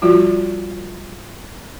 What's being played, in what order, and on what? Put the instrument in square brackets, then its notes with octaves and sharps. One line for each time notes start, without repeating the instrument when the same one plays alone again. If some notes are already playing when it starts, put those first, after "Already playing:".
[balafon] F3 G3 F4 F#4